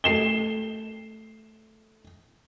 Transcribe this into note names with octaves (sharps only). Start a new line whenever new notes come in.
A3 C7 E7 G7